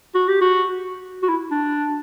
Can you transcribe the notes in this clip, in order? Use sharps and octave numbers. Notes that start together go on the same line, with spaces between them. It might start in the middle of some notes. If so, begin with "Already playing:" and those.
F#4
G4
F#4
F#4
E4
D4